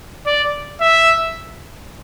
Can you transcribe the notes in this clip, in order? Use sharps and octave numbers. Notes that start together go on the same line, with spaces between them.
D5
E5